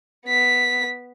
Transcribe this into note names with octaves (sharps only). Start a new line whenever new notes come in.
B3 B6